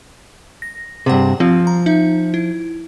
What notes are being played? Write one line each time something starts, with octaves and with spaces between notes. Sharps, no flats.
A#6
G2 C3 G#4 C5 F#5
F3 C4
A#5
D#4 E5
E4